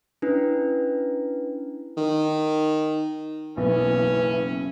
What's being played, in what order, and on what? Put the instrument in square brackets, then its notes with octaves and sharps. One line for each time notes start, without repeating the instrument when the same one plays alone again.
[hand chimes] C#4 D4 E4 B4
[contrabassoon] D#3
[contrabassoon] F#1 [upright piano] B1 [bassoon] E3 [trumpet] C#4